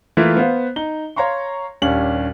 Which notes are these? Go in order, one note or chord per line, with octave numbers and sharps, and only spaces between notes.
E3 A3 A#3 E4 F4
B3 C5 F5
D#4 G7
C#5 F5 A#5 C6 C#6
D#1 D#2 C#4 D4 F#7